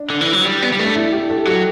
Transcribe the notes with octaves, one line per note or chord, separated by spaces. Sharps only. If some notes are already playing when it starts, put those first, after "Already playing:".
Already playing: D4
D3
E3
F#3
G3
B3
G3
A3
D4
E4
G4
A4
F#3 G4